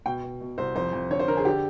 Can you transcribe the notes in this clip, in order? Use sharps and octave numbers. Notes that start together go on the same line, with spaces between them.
B2 G5
B2
B2
C2 C5
F2 C5
F2
D3 C#5
C5
D3 A#4
G#4
D3 G4